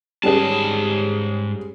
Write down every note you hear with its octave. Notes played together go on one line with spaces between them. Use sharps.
G#2 G3 C#4 G#4 A5